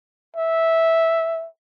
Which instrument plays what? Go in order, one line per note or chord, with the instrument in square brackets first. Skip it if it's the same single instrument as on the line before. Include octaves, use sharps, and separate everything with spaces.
[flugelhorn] E5